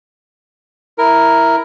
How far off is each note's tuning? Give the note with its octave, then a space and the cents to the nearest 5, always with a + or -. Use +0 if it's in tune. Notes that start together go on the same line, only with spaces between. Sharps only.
E4 +0 A#4 +0